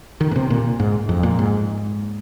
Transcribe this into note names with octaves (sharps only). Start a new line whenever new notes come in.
D#3
A#2
C3
A#2
G#2
F2
A#2
G#2